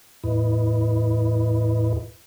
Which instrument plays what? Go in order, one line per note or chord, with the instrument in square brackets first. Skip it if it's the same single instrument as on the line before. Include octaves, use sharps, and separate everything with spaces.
[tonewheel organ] E2 A2 E4 B4 D#5